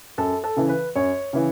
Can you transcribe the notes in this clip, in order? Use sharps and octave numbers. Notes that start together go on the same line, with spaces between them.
F#2 A4
A4
C#3 E3
B4
F#2 C#5
C#3 E3